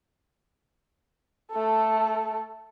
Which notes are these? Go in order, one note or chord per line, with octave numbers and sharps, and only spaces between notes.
A3 A4